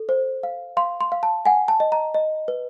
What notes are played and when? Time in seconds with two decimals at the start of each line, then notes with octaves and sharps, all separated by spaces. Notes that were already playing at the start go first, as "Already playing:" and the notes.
Already playing: A4
0.09 C5
0.43 F5
0.77 F5 C6
1.01 C6
1.12 F5
1.23 A5
1.45 F#5 G#5
1.68 A5
1.80 D#5
1.92 A#5
2.14 D#5
2.48 B4